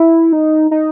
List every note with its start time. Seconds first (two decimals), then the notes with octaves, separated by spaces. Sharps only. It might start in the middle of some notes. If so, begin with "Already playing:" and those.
Already playing: E4
0.32 D#4
0.71 D#4